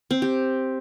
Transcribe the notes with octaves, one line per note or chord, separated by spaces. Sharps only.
C4
G4